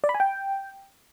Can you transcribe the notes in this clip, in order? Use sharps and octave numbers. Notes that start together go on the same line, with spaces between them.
D5
B5
G#5
G5